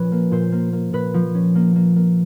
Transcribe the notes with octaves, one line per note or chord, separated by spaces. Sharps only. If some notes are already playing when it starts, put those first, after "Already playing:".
Already playing: A#2 F3 C#4 B4
A#3
A#2 C5
A#3
A#3
A#2 B4
F3
C#4
A#3
A#3
A#3